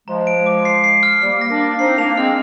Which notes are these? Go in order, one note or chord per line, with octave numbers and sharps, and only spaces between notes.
F3 G#3 A#5
D7
D6
C7
C7
F6
G3 A#3 F6
A#6
A#3 D4
D6
C4 D#4 C7
A#3 D4 F7
G#3 C4 F6